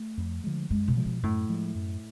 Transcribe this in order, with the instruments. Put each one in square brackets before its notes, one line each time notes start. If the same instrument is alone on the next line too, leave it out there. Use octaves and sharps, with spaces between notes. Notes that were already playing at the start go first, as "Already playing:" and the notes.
Already playing: [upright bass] A3
[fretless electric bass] F2
D3 F3 G#3
[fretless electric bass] F#2 [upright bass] G#3
[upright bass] B2
[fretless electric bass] F3 G#3
[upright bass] B2
[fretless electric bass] F#2 [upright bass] A2
[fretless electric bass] F3 G#3
F#2